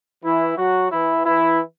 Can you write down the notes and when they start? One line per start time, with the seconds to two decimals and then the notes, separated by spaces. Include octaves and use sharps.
0.24 E3 E4
0.57 F#3 F#4
0.91 E3 E4
1.25 E3 E4